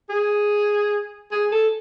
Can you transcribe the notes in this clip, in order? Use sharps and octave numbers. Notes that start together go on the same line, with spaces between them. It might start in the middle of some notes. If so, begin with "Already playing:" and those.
G#4
G#4
A4